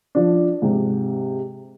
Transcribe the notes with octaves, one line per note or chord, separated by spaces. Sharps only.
F3 D4
G#2 C3